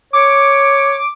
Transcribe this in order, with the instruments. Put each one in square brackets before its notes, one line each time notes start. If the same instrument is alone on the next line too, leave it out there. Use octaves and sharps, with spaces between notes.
[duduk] C#5 [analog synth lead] D6